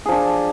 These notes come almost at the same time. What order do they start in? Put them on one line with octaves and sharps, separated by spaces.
G#4 F3 D4